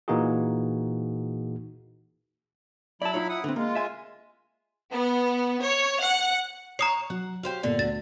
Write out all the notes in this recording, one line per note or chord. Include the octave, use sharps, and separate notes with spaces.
A#2 E3 A#3 D#4 F#4 G#4
F#3 E4 D5 A5 B5
D#4 F4 C#5
E4 F#5 D#6
D3 C4 B4
G#3 A#3 F4
E5 G#5
B3
C#5
F#5
C#5 A#5 D#6 C7
F#3 F#5
F#4 G4 C5 C#5 F5
G1 A#2 D3 A4
D2 A6